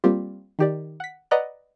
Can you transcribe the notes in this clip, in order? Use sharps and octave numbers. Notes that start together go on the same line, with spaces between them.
G3 A#3 C4 F4 G4
D#3 G4 D5
F#5 B6
B4 D5 D#5 F#5 A#5 F#6